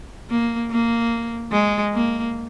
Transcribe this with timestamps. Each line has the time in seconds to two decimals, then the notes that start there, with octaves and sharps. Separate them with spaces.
0.30 A#3
0.70 A#3
1.52 G#3
1.94 A#3